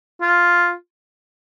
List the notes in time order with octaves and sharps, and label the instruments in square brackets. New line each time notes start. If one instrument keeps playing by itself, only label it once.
[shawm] F4